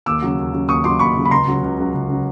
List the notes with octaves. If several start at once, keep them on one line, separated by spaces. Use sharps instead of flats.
D#2 D6 E6
C#3 F#3
D#2
C#3 F#3
D#2 C#6 D#6
C#3 F#3 C6 D6
D#2 B5 C#6
C#3 F#3
B5
C#2 A#5 C6
C#3 F#3
C#2
C#3 F#3
C#2
C#3 F#3